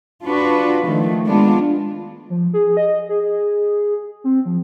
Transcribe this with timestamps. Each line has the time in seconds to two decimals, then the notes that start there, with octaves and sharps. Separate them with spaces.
0.24 D4 F4 F#4 B4
0.86 D#3 F3 A3
1.26 G#3 B3 D4 F4
2.30 F3
2.54 G#4
2.77 D#5
3.09 G#4
4.24 C4
4.45 F3